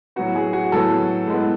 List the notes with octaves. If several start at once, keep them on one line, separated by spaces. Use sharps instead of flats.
A2 F#3 B3 F#4
G#4
F#4
A2 F#3 B3 A4
A2 G#3 B3